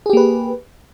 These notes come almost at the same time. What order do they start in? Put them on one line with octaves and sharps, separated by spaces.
G#4 G4 A#3 B4